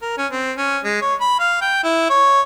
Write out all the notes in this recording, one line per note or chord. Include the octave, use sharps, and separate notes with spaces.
A#4
C#4
C4
C#4
G#3
C#5
B5
F5
G5
E4
C#5